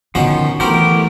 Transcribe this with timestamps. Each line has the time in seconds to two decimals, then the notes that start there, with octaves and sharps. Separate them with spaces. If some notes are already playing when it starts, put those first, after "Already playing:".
0.15 B2 D3 D#3 F3 B3 C#4 F#4
0.60 E3 F#3 A3 B3 F#4 G4 A#4 C5